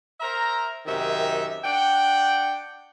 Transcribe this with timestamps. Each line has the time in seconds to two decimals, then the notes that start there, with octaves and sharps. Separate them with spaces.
0.20 A#4 C5 E5 A#5
0.86 F#2 C3 D#3 D#4 E5
1.64 D4 F#5 G5